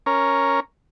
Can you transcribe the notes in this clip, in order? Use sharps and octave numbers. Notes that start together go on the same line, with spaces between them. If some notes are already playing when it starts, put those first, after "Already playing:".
C#4 A#4